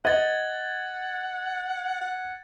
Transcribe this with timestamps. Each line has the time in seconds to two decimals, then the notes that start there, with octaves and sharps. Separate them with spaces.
0.05 D#5 F#5 G#6 A6
2.01 F#5